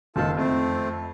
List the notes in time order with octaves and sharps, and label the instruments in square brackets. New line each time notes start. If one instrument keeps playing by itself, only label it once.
[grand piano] F#1 D#3 [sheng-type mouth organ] F4 A4 A5
[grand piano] F2 [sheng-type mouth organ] A3 C4